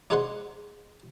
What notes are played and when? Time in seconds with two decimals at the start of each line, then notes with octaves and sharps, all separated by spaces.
0.10 D4 D#4 G#4 C5 F#5 C6